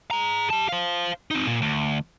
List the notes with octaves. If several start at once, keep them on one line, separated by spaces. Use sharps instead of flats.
G#4 A#5
G4 A5
C5 F5
C4 D#4
A#2
D2